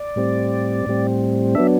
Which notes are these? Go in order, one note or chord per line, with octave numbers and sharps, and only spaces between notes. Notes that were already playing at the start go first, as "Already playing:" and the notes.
Already playing: D5
A2 G3 C4
A2 G3 C4
F#3 B3 D4 E5